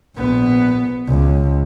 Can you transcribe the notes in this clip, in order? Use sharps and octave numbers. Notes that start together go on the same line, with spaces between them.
A#1 B3
C#2